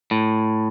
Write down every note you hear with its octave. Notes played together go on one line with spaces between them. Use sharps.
A2